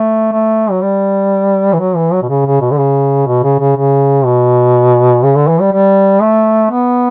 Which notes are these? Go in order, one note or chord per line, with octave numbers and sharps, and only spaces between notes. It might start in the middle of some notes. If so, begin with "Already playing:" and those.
Already playing: A3
A3
F#3
G3
E3
F#3
E3
F#3
B2
C#3
C#3
B2
D3
C#3
B2
C#3
C#3
C#3
B2
C#3
D3
E3
G3
G3
A3
B3